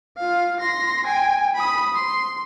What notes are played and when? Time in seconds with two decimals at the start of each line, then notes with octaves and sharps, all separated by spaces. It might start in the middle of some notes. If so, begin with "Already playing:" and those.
0.18 F4 F5
0.60 C6 A#6
1.06 G5 G#5
1.54 B5 D#6
1.95 C6